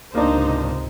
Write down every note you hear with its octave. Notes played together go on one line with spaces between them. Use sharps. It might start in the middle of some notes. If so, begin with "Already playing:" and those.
C#2 G#2 C3 A#3 D4 D#4 C5